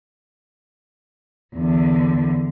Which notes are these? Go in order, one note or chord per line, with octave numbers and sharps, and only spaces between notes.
E2 D3